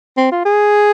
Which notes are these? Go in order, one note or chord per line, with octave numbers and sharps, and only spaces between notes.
C4
F4
G#4